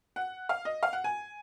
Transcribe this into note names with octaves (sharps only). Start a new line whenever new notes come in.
F#5
F5
D#5
F5
F#5
G#5